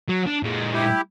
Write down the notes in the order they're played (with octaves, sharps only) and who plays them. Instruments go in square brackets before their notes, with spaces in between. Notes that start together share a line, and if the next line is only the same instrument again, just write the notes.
[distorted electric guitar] F#3
D4
A#2 G#3
[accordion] E4 G4